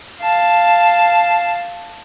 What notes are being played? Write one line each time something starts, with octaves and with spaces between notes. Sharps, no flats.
F5 A5